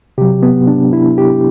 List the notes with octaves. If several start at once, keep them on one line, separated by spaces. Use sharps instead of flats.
C3 F#3 G4
B3
D4
E4
G4